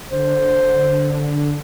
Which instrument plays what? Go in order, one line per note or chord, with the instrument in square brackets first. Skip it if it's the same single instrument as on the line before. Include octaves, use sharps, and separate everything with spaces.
[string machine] D3 [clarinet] C5